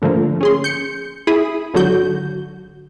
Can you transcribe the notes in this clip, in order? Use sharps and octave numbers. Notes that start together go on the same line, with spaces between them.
G#2 D3 F3 A3 A#3
C#4 G#4 C6
G6 C#7
E4 G#4 B5 D#6
G#1 D3 F#3 F#4 G6